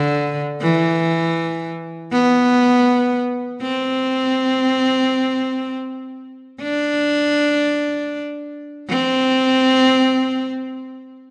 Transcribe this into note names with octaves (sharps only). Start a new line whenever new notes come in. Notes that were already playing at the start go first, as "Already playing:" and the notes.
Already playing: D3
E3
B3
C4
D4
C4